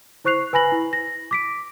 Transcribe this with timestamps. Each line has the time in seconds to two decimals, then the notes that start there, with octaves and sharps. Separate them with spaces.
0.25 E4 C5 C#6 F#6 C7 F7
0.53 B4 G#5 B5 A#6 F#7
0.72 E4
0.93 A#6
1.31 D6 B6 D7